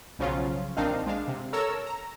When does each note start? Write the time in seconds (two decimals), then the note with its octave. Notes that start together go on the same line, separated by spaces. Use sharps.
0.19 B1 C#3 F3 F#3 C#4 F4
0.77 A#1 D#3 C4 D4 D#4 F5
1.06 G#3 D4 F5
1.28 C3
1.53 A4 A#4 C#5 A#5 E6
1.86 A#5